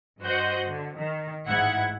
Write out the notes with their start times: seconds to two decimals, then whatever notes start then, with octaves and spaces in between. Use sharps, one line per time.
0.22 G2 F#4 C5 D#5 F#5 G6
0.67 D3
0.98 D#3
1.46 A1 G#2 E4 F#5 G#6 C#7